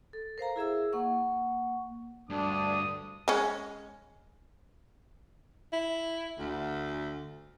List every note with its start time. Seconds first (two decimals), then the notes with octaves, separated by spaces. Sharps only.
0.13 A4
0.38 A#4 C5 F5 A#5
0.56 E4 G#4 E5 E6
0.93 A#3 F#5 C#6
2.30 D2 G2 D4 D#6
3.28 G#3 C#4
5.73 E4
6.39 D2